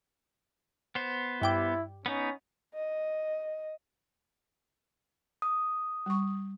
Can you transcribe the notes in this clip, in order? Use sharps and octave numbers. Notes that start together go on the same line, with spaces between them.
B3 C5
G2 E4 G5 D6
B3 C#4 D#4
D#5
D#6
G3 C#6